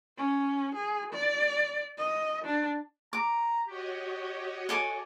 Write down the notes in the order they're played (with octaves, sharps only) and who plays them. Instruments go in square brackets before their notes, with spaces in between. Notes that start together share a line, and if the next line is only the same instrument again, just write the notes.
[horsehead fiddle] C#4
G#4
D5
D#5
D4
[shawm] A#5 [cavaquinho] D6
[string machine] F#4 C#5 D#5 [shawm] G4
[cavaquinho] A4 G#5 D6